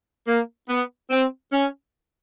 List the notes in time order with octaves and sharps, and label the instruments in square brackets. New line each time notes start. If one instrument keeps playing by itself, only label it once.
[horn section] A#3
B3
C4
C#4